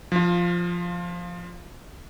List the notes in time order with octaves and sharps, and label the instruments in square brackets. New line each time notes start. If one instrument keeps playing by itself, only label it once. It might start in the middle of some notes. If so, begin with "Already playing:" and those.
[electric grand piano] F3 F4